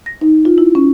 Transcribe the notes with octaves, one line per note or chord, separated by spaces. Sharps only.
A#6
D#4
F4
E4
C#4